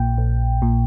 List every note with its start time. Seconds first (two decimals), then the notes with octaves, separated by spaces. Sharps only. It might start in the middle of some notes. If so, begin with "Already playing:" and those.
Already playing: A#1 A#2 G5
0.18 A#1
0.62 A#2